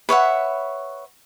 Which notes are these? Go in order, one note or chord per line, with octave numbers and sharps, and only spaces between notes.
B4 C#5 E5 F#5